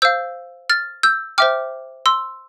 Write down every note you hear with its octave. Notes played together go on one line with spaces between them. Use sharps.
C5 F5 E6 G6
F6 A6
E6 G6
C5 E5 G5 D6 F6
C6 E6